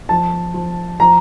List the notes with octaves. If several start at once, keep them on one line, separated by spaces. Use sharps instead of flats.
F3 A5
F3
F3 A#5